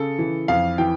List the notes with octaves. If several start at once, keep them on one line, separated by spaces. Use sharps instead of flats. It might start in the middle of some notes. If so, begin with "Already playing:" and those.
Already playing: C#3 A4
E3
F2 F5
E3 G5